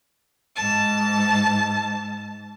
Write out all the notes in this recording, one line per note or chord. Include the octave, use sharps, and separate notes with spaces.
G#2 A5